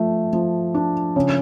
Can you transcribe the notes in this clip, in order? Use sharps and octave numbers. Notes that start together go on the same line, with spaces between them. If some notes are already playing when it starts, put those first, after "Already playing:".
Already playing: F3 A3
F3
D4
C#3